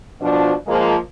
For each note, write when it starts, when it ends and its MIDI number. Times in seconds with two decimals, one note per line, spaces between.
0.21 0.53 47
0.21 0.53 53
0.21 0.53 62
0.67 0.95 53
0.67 0.95 56
0.67 0.95 58